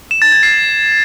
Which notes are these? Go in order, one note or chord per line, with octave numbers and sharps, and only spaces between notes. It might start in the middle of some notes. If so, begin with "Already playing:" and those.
E7
A6
G#6
C7